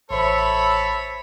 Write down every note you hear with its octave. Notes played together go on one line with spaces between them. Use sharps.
A1 A4 C5 C#5 E5 B5